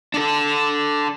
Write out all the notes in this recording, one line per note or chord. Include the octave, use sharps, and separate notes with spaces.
D4 A4